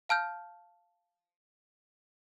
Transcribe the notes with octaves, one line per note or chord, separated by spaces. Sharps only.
F5 A5 F6 G6